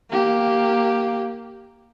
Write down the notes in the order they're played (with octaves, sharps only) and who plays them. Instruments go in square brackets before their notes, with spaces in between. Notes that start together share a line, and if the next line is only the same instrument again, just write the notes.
[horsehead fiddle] A#3 G4